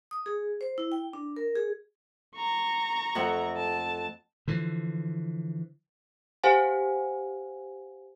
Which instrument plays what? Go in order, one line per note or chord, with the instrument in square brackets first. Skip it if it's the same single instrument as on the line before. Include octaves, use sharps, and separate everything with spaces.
[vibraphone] D#6
G#4
C5
E4
G5
D4
A#4
G#4
[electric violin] A#5 C#6
[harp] F2 A3 F#5
[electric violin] A5
[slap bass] D3 E3 F3
[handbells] G4 C5 F5 F#5 G#5